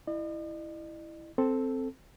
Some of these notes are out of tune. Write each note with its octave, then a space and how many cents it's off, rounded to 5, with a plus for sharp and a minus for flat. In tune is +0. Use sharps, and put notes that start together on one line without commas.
E4 +0 D#5 -45
C4 +0 A4 +0